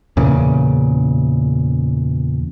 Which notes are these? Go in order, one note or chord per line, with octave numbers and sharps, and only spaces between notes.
E2 A#2 C#3